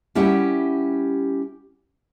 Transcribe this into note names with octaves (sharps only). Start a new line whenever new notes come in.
G3 C#4 E4 G4 F#5